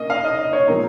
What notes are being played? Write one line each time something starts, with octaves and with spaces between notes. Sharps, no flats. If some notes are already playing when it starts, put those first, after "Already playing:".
Already playing: A#3 C#4 D#5
F5
D#5
D#5
C#5
A#2 F3 G#3 C4 A#4